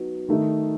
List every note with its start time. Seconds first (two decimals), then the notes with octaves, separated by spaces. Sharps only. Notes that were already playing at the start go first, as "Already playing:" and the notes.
Already playing: F#3 B3 D#4
0.28 D#3 A3 D#4